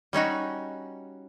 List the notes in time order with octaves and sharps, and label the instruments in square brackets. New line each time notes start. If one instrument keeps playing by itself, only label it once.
[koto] G3 C#4 D#4 F#4